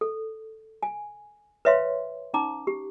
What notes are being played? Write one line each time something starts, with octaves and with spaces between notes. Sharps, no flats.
A4
G#5
B4 C#5 E5 F5 C6
C#4 D#4 A#5 D6
G4